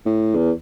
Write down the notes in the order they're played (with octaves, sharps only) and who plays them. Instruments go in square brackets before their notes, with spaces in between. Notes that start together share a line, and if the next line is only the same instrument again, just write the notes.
[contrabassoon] A2
E2